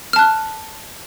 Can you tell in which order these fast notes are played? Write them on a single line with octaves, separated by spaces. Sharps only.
F6 A5 F#6